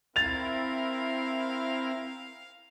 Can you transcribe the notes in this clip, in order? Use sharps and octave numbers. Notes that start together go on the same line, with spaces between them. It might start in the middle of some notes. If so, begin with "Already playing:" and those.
C4 E4 A#4 F5 A6 F7